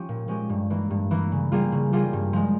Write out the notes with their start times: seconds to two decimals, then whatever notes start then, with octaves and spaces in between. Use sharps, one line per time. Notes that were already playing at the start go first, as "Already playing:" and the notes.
Already playing: F3 C#4 G4
0.09 A#2
0.28 F3 G#3 C#4 G4
0.49 G2
0.70 E3 A#3
0.90 G2
1.11 E3 A#3
1.32 C#3
1.52 G3 A#3 F4 G#4
1.72 C#3
1.93 G3 A#3 F4 G#4
2.13 G2
2.33 F3 G#3